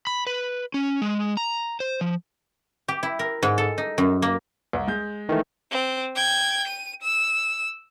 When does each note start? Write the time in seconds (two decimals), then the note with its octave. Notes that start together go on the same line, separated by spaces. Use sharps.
0.07 B5
0.27 B4
0.74 C#4
1.02 G#3
1.37 A#5
1.80 C5
2.01 F3
2.88 G4
3.03 E4
3.19 A#4
3.43 G#2
3.58 A4
3.78 D#4
3.98 F#2
4.22 A#3
4.73 C2
4.87 G#3 G6
5.29 D#3 E3 A3
5.71 C4
6.15 G5 G#6
6.67 D#7
7.02 E6